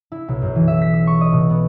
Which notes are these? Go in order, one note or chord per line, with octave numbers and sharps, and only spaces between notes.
E4
B1
F#2
E3
E5
B6
E6
C#6
D#5
B2
B3